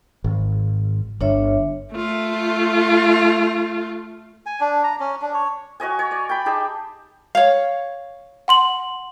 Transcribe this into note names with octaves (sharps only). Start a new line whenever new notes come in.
G#1
G1 D4 C#5 E5
A3 F4
G#5
D4
A#5
C#4
D4
C#5
F#4 C#5 D#5 G#5
C#5
D5
G5 B5
D#4 G4 G#4 A5
C#5 F5
F#5 C6 F#7